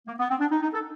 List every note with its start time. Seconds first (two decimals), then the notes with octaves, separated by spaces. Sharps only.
0.07 A#3
0.19 B3
0.29 C4
0.40 D4
0.51 D#4
0.62 D#4
0.73 A4